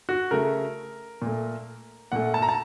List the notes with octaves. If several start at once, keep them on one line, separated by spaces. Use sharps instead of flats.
F#4
C#3 A3 A#4
A#2 A3
A#2 A3 F#5
A5
A#5
A5